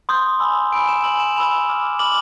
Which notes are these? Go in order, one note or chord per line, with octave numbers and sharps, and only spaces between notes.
C6 D#6 G6
G#5 B5 E6
G#5 B5 E6 D7
E7
G#5 B5 E6 F#7
E7
G#5 B5 E6 F7
B5 D6 F6
B5 D6 F6 F#7